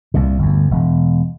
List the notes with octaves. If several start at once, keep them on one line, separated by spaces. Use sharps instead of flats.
C2 A#2
G1 D2
E1